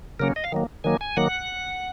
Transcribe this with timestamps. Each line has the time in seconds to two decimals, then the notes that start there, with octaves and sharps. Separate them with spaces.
0.20 C#3 F#3 A#3 C#4 A#4
0.36 D#5
0.44 F5
0.52 D#3 F#3 A#3
0.84 D#3 F#3 A#3 G#5
1.01 G#5
1.17 D#3 F#3 A#3 F#5